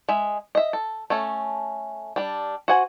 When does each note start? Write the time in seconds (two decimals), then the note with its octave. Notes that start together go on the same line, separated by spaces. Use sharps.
0.09 G#3 E5
0.55 D#5 E5
0.73 A4
1.10 A3 C#4 A4
2.16 G3 D4
2.68 F#4 C5 F#5 G#5